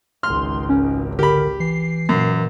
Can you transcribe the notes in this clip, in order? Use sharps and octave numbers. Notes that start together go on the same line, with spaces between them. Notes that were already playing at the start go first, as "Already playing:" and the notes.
G#1 C#2 C6 F6
C#4
D3 G4 A#4 B5
E3 C7
F#2 A#2